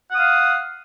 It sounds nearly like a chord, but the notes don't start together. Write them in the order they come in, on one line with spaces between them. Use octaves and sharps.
F#5 D#6 F5